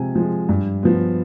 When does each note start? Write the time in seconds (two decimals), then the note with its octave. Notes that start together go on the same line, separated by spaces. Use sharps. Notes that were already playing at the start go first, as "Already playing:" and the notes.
Already playing: C3 F3 G#3 G#5
0.15 F3 G#3
0.49 G2
0.83 F3 B3